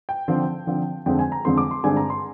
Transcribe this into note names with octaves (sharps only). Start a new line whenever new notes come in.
G5
D3 F3 C4
D3 F3 C4
F2 D3 G#3 C4 G5
G#5
A#5
F2 D3 G#3 C4 C6
D6
C6
G2 D3 G#3 C4 G#5
A#5
C6